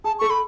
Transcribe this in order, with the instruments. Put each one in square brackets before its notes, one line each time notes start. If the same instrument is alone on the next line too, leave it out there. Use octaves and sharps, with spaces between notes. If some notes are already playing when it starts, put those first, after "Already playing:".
[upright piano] G#4 [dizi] A5
[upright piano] A4 [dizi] C#6
[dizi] B5